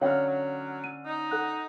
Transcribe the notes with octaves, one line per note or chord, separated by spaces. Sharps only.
D3 F#3 C#4 C#5 F5 G5 F6
F#3
D#7
D#4
A4 F#5 F#6